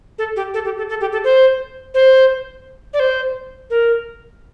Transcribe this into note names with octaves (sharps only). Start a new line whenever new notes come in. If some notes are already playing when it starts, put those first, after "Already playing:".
A4
G4
A4
G4
A4
A4
G4
A4
C5
C5
D5
C5
A#4